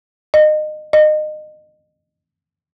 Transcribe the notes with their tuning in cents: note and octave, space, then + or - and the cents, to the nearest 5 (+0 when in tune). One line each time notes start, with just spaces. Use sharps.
D#5 -25
D#5 -25